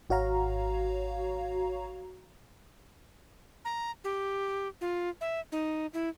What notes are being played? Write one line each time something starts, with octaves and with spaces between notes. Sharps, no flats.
G#1 F#4 C#5 F5 A#5
A#5
G4
F4
E5
D#4
E4